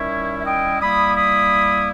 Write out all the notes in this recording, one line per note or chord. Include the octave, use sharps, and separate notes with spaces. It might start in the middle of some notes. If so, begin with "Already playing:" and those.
Already playing: D#3 G3 C#4 E4 C#5 E5
E5
D#5 G5
G3 A#3 E4 B5 D#6
B5 D#6